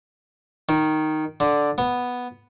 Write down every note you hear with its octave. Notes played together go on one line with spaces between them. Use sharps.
D#3
D3
B3